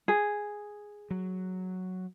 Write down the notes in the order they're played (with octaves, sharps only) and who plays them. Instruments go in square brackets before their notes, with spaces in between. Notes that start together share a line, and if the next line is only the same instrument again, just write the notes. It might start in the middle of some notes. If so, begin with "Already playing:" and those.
[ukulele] G#4
[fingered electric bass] F#3